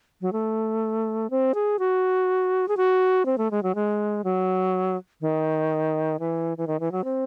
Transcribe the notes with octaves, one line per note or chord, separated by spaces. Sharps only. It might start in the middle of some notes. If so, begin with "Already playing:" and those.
F#3
A3
C4
G#4
F#4
G#4
F#4
C4
A3
G#3
F#3
G#3
F#3
D#3
E3
E3
D#3
E3
F#3
C4